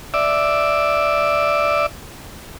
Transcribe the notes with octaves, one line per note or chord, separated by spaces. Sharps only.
D5 E5